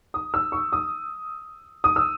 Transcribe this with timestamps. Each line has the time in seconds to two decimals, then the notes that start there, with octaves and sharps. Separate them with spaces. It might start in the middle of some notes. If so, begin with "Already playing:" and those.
0.14 D#6
0.34 E6
0.52 C#6
0.72 D#6
1.84 D#6
1.96 E6